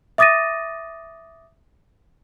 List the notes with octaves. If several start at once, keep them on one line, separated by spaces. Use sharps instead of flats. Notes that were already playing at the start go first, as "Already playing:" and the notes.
E5 D6 D#6 A6 A#6 D#7